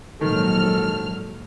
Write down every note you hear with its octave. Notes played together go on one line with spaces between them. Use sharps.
A#1 G#2 D#3 F#3 A4 F6